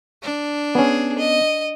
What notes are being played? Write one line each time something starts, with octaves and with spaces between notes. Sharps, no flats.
D4
B3 C#4 G#4
D#5